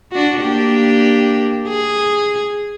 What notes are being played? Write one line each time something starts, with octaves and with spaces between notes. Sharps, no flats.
D4 F#4
A#3 D4 G4
G#4